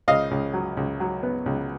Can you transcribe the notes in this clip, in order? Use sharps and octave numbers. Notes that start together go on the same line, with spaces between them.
C#2 D#5 F5
C#2
F#3
C#2
F#3
B3
C#2